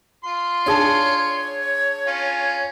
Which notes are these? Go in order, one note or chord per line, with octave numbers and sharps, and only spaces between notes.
F4 C6
D4 G#4 C#5 A5
C#4 F4